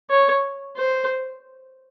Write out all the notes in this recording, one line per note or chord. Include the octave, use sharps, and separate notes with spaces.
C#5
C5